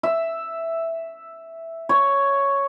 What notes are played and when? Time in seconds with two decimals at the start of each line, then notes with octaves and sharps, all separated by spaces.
0.03 E5
1.89 C#5